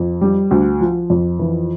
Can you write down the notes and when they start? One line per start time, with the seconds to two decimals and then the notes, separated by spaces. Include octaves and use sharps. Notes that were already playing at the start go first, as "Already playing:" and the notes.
Already playing: F2
0.21 G3
0.51 D2
0.81 F3
1.10 F2
1.39 E3